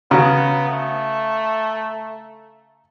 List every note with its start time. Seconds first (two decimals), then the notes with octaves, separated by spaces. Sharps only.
0.11 C#3 B3 F#4 A#5
0.69 A3